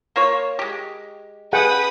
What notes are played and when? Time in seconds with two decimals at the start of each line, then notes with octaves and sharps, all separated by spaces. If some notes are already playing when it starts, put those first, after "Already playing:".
0.16 A#3 F4 C#5
0.59 G#3 G4
1.53 G#4 B4 F#5 G5 D#6